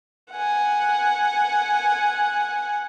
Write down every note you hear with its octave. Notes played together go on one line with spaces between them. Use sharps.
F#5 G#5